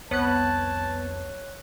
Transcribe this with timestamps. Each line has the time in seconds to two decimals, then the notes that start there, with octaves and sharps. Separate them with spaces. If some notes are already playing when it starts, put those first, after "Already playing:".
0.11 C2 F2 B3 C4 C#5 A5 F#6